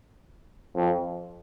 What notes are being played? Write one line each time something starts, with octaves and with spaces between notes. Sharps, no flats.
F2